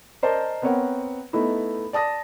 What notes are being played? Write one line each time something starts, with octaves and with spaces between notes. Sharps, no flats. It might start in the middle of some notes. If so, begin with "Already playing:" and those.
A#4 C5 D5 D#5 A5
B3 C4 A#4 C#5 F#5
A3 B3 D#4 E4
D5 A5 D#6 A#6